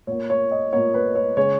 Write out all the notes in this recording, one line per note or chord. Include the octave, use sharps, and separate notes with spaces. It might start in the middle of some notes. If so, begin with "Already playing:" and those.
A#2 A#3 C#5
C#5
D#5
A#2 A#3 C#5
B4
C#5
C#3 G#3 C#5